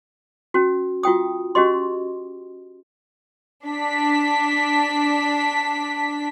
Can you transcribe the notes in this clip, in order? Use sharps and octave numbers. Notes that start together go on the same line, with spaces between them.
C#4 F#4
F4 F#4 G5 D#6
C#4 F#4 G4 D#5 C6
D4 B6